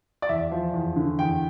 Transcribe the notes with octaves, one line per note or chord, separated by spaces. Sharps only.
D5
E2 E5
F3
E2
D3
E2 G5